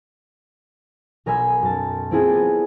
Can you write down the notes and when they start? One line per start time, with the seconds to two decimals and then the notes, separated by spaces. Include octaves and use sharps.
1.26 B1 A#4 D#5 G#5 B5 E6
1.62 F#2 A5
2.11 A#3 C4 E4 F4 G#4 A4
2.29 B3 D5